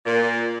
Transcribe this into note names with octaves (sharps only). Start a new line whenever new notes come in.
A#2